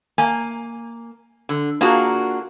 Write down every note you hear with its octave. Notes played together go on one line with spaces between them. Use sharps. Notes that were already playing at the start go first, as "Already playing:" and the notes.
A#3 G#5
D3
A#3 D4 F4 F#4 G#4 A#4